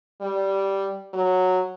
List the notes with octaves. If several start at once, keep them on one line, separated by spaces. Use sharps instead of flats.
G3
F#3